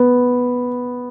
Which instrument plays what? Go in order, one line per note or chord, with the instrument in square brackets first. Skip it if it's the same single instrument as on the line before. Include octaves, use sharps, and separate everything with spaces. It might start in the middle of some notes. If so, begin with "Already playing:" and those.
Already playing: [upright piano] B3